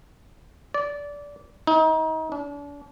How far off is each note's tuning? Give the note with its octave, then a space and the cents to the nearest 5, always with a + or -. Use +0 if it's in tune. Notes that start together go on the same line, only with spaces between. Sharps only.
D5 -20
D#4 +30
D4 -40